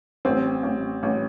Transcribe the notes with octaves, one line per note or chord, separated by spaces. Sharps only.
A1 C4
A1
A1